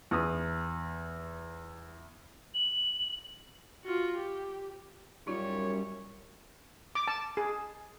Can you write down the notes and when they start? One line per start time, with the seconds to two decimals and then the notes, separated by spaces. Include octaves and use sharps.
0.11 E2 D#6
2.54 F#7
3.84 F4 F#4
4.16 G4
5.27 F#2 A#2 G3 D#4 F4 C#5
6.95 D6
7.08 A5
7.37 G#4